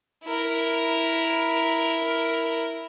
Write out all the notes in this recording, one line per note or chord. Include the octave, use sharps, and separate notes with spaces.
E4 A#4